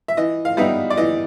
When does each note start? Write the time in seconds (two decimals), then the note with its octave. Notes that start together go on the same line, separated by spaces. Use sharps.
0.08 E5
0.17 E3 D#5
0.45 F5
0.57 G3 B3 D#4 E5
0.90 D5
0.97 E3 D#5